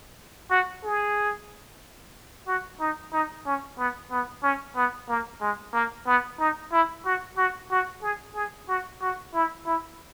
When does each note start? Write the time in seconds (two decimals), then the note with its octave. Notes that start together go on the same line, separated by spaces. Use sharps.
0.50 F#4
0.83 G#4
2.47 F#4
2.80 D#4
3.13 D#4
3.46 C#4
3.78 B3
4.11 B3
4.43 C#4
4.75 B3
5.09 A#3
5.41 G#3
5.74 A#3
6.07 B3
6.39 D#4
6.72 E4
7.05 F#4
7.37 F#4
7.71 F#4
8.02 G#4
8.35 G#4
8.68 F#4
9.01 F#4
9.34 E4
9.66 E4